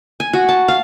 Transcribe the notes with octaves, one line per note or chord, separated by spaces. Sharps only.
G#5
F#4
A5
F5